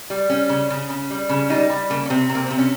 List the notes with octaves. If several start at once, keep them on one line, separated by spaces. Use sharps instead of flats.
G3
G3 C#4
C#3
C#3
C#3
G3
C#3
G3 D#4
G3
C#3 A#3
C#4
C3 C4
C3
A#3
C3 C4
C#4